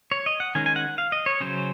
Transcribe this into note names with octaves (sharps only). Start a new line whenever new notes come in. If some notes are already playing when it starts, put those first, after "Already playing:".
C#5
D#5
F#5
D#3 G#3 C#4 G#5
G#5
F#5
F5
D#5
C#5
C#3 F#3 C#4 C5